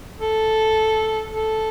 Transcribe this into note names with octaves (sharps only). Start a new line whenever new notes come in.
A4
A4